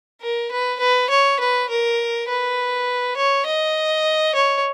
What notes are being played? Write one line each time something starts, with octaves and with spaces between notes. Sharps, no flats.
A#4
B4
B4
C#5
B4
A#4
B4
C#5
D#5
C#5